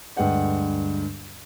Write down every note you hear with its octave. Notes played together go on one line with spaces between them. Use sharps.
D2 G2 G#3 B4 F#5 G5